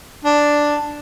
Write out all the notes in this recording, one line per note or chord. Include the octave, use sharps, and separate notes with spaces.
D4